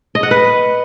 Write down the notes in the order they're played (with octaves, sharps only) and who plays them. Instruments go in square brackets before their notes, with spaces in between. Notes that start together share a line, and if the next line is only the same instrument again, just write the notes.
[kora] D#5
F#5
B4